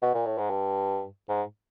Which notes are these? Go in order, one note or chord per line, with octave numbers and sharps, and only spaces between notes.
B2
A#2
A2
G#2
G2
G#2